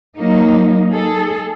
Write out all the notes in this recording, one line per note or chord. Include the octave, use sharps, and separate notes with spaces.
F#3 A#3 D#4
G#4 A4